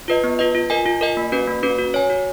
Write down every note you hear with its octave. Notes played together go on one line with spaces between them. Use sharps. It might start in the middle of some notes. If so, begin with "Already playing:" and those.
F4 B4 D#5
B3
F4 B4 D#5
F4
A#4 D#5 G#5
F4
A#4 D#5 G#5
A#3
C#4 F#4 B4
A#3
C#4 F#4 B4
F#4
C#5 G#5
F#4